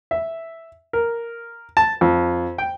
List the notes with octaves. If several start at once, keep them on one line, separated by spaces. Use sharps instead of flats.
E5
A#4
A5
F2
G5